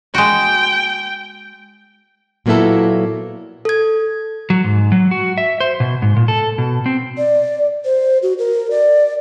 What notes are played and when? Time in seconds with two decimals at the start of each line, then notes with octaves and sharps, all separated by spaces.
0.15 G#3 F#4 G5
2.46 A#2 F#3 A#3 B3 E4 A4
3.65 A4 G#6
4.50 F#3
4.64 G#2
4.92 F#3
5.11 F#4
5.38 E5
5.60 C5
5.80 B2
6.02 G#2
6.16 A#2
6.28 A4
6.58 B2
6.86 C4
7.18 D5
7.85 C5
8.23 F#4
8.39 A#4
8.71 D5